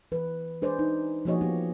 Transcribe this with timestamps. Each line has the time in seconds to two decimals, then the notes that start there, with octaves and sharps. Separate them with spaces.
0.12 E3 B4
0.62 D4 G#4 B4 C5 D5
0.79 D#4
1.25 F3 A#3 F#4 G#4 C#5 D#5
1.41 B3 F4 G4